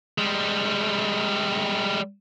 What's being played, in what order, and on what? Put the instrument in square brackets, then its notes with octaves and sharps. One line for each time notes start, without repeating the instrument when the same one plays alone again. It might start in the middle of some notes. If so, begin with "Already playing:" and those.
[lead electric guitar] G3 G#3